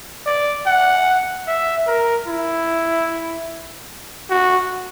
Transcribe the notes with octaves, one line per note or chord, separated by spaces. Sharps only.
D5
F#5
E5
A#4
E4
F#4